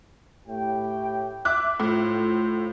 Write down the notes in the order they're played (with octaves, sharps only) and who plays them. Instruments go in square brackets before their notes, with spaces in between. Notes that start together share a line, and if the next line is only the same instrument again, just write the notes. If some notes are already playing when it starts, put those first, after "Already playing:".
[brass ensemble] A2 G4 G5
[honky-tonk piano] E5 D6 F#6
[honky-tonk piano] A2 [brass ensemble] F4 C5